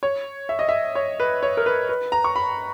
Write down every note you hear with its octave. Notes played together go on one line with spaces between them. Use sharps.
C#5
E5
D#5
E5
C#5
B4
C#5
A#4
B4
B4
A#5
C#6
B5